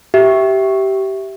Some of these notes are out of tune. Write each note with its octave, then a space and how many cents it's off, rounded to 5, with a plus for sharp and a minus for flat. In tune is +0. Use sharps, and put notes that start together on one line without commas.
G4 -20 E5 +0